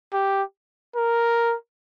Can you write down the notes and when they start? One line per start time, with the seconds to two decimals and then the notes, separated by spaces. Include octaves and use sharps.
0.13 G4
0.96 A#4